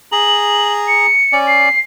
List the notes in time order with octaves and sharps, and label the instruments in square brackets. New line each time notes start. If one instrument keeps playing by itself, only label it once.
[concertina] G#4 A#5 [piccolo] F#7
[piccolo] C#7
[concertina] C#4 D5
[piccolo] C7